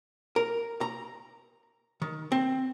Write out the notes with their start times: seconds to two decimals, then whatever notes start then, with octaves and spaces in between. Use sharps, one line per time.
0.36 A#4
0.81 A#5
2.02 D#3
2.32 C4